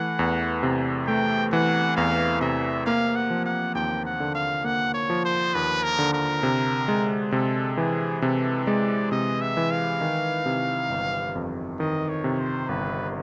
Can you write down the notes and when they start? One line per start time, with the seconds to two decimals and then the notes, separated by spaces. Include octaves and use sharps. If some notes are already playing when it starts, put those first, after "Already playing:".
Already playing: E3 A3 F#5
0.19 E2
0.63 C3
1.07 A3 G5
1.53 E3 F#5
1.97 E2 F5
2.41 C3 E5
2.86 A#3 F5
3.16 F#5
3.30 F3
3.45 F#5
3.75 D#2 G5
4.06 F#5
4.20 D3
4.35 F5
4.64 A#3 F#5
4.94 C#5
5.10 F3
5.25 C5
5.54 D#2 B4
5.84 A#4
5.99 D3
6.14 A#4
6.43 C3
6.88 G#3
7.32 C3 A4
7.77 E3 G#4
8.22 C3 A4
8.66 G#3 D5
9.11 C3 D#5
9.41 E5
9.57 E3
9.71 F5
10.01 D#3
10.46 C3
10.90 G1
11.35 F2
11.79 D#3 D#5
12.09 C#5
12.24 C3
12.39 C5
12.69 G1 B4